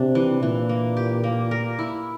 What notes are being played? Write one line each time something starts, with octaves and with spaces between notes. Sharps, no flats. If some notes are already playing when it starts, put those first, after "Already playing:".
Already playing: C3 D4
E3
A#2 E3
A#3
G4
A#3
A#4
E4